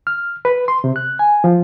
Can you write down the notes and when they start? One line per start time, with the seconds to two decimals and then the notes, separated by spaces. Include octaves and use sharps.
0.07 F6
0.45 B4
0.68 C6
0.84 C3
0.96 F#6
1.19 G#5
1.44 F3